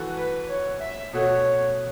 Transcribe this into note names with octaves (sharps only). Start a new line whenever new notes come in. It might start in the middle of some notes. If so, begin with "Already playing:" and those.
Already playing: E3 A3 F#4 A4
B4
C#5
E5
B2 A3 F#4 A4 C#5